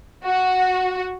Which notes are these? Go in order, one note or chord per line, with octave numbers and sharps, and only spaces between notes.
F#4